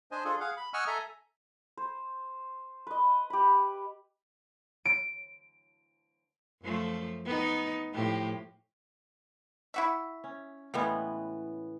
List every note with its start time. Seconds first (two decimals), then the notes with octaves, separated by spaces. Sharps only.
0.11 D4 C5 D#5 G#5
0.25 D4 F4 G#4 A4
0.40 G#4 F5 F#5
0.57 B5
0.73 D#5 F#5 G#5 C#6 E6 F6
0.87 A4 E5 G#5 A#5
1.77 C5
2.87 B4 D#5
3.30 G4 B5
4.85 D7
6.62 F#2 F3 A3
7.25 B3 D#4
7.94 A2 F3 G4
9.74 E4 F#4 E5
10.24 C#4
10.74 A2 C#3 E3 G3 G#3 B3